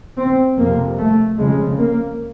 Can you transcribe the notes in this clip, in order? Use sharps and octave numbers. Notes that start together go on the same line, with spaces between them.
C4
F2 C3 A#3
A3
F2 C#3 G#3
A#3